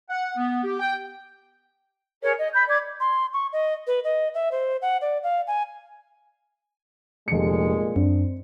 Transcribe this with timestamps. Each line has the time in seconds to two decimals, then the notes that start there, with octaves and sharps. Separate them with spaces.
0.10 F#5
0.36 B3
0.64 G4
0.79 G5
2.23 G#4 A#4 C#5
2.37 D#5
2.53 B5 G6
2.67 D5 D6 G#6
3.00 C6
3.33 C#6
3.53 D#5
3.87 B4
4.04 D#5
4.34 E5
4.52 C5
4.82 F#5
5.01 D5
5.23 F5
5.47 G#5
7.28 F1 A#2 G#3 C#7
7.96 F#2 C4 D4